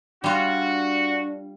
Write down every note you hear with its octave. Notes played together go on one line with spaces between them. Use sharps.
G3 D4 F4 F#4